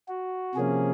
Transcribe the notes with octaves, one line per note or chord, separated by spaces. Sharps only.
F#4
C3 F3 A#3 C#4 G#4